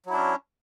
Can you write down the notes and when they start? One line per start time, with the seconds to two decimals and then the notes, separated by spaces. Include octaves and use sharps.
0.06 F#3
0.09 E4
0.13 D4
0.17 C#4